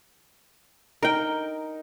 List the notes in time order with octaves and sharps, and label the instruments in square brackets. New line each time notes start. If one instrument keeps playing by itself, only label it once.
[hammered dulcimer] D#4 [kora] A#4 G5